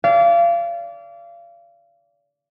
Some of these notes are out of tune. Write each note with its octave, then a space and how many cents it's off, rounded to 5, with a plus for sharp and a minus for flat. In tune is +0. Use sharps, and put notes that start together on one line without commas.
D5 -30 F5 -30